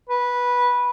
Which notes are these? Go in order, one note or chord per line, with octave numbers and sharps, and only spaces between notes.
B4